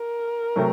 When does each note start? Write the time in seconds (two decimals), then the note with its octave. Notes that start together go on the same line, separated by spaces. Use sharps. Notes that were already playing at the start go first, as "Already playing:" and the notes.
Already playing: A#4
0.56 C3 F#3 A3